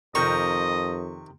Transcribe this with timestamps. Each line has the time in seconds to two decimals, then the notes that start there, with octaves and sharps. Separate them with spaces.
0.15 F2 C3 D#3 A#4 D#5 C#6